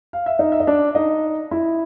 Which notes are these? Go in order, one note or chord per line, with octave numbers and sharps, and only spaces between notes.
F5
E5
D#4 D#5
E5
D#5
D4 D5
D#4 D#5
E4 E5